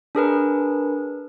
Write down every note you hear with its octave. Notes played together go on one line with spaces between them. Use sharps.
D4 G#4 A#4 B4